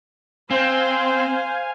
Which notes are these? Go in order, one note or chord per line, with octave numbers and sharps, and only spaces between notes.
C4 C5 F5 G#5